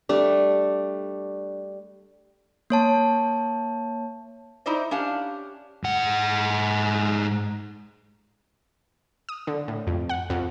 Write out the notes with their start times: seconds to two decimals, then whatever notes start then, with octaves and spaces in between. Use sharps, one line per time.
0.09 G3 A3 D4
2.70 A#3 C#5 A5
4.66 D#4 E4 C5 D5 D#5
4.91 C#4 D4 G4 F5 A5
5.84 G#2 F#5
9.29 D#6
9.47 D3
9.68 A2
9.87 F2
10.09 F#5
10.30 F2